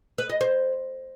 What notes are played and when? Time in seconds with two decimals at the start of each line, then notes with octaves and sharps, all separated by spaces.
0.18 B4
0.30 D#5
0.41 C5